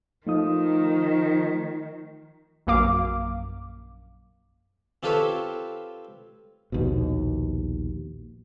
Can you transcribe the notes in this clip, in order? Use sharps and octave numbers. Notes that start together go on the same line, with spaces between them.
D#3 F3 A3 D#4 D#6
A#1 F#2 A#3 F5 D6
C4 F4 G4 A4 B4 C#5
A#1 D#2 B2